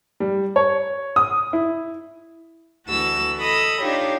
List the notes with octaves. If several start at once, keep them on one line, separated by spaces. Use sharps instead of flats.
G3
C#5
D#6
E4
D2 E3 F#4 A4 E6
A4 D#5 B5 D#6 E6
D4 D#4 F4 G4 C#5